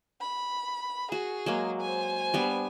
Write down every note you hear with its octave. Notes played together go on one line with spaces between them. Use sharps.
B5
F#4 G#4
F#3 G#3 A#3
C5 G#5
G3 B3 D4